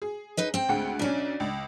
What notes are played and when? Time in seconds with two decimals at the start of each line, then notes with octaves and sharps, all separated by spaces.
0.02 G#4
0.37 D#4 B4 D#5
0.54 C4 G5
0.69 D2 G#3 F#5
0.99 B1 C#4 D4 D5
1.40 C#2